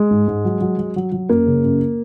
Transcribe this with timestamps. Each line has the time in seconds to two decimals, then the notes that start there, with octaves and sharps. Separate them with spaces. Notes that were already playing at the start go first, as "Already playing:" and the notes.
Already playing: G#3
0.11 G#2
0.28 G#2
0.45 F#3
0.61 F#3
0.78 F#3
0.96 F#3
1.12 F#3
1.29 F#2 A#3
1.46 C#3
1.64 F#2